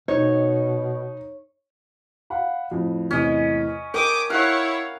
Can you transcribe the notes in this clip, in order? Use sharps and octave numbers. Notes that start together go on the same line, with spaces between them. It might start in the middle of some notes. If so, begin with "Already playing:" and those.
B2 D#4 C#5
F5 F#5 B5
F2 A2
E2 A2 C3 C#4 D#5
A#4 G5 D6 D#6
E4 C#5 F5 F#5